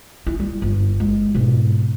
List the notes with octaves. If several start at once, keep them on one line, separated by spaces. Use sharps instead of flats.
E4
G3
G1
G#3
G#2 B2